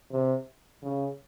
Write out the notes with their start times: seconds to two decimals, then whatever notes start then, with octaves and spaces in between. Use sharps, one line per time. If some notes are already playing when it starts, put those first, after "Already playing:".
0.11 C3
0.83 C#3